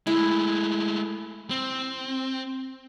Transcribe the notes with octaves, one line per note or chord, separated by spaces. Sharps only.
G#3 A3 E4
C4